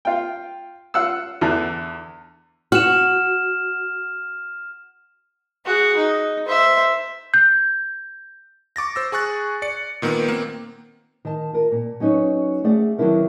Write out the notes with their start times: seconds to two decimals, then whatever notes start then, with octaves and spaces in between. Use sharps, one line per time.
0.05 F4 G5
0.94 F4 F#5 E6
1.41 E2 D3 E3
2.72 F#4 F6 E7
5.66 F#4 G#4
5.97 D#4
6.46 C5 E5
7.34 G6
8.76 C#6 D6 A6 A#6
8.95 C5 E6 A#6
9.12 G#4 G#5 C#6 F#6 A6
9.62 D5 C#7
10.02 A#2 D#3 A#3 B3
10.28 A#3 C4
11.25 D#3 A5
11.53 F4 A#4
11.71 A#2
12.00 F#3 C#4 D#4 B4 C#5
12.64 A3 G#4 D5 F#5
12.98 D#3 F#3 B3 D4 E4 A#4